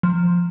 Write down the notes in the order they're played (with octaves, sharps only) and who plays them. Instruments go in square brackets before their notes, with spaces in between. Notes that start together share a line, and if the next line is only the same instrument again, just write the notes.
[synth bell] F3